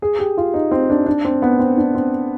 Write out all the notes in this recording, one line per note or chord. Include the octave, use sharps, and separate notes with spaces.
G#4
G4
F4
D#4
C4
D4
D4
C4
B3
C4
D4
C4